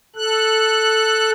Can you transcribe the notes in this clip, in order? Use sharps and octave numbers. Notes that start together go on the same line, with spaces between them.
A4 F#6